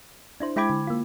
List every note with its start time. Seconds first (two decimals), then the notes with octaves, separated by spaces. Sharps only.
0.40 D4 E4 C5
0.56 G#3 E4 G5 B5 D6 G#6
0.70 D3
0.87 A#3 F4